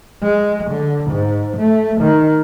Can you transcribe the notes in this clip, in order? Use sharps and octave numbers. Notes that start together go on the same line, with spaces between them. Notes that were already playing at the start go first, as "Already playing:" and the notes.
G#3
D3
G#2
A3
D#3